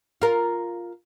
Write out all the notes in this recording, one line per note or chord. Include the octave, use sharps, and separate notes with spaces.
F4 A#4